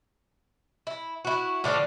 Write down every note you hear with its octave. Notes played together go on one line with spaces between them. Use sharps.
E4
E4 F#4
A2 D3 F3 D4